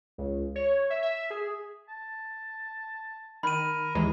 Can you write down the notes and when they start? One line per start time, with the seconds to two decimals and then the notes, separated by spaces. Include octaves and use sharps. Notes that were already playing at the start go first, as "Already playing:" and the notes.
0.18 C#2
0.55 C#5
0.90 E5
1.03 E5
1.30 G#4
1.89 A5
3.43 D#3 A#4 B5 D#7
3.95 D#2 E3 G#3 A#5